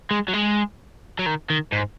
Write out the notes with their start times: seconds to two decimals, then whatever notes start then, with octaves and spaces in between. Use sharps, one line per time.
0.11 G#3
0.28 F#3
0.33 G#3
1.19 F#3
1.26 D#3
1.50 D#3
1.72 G#2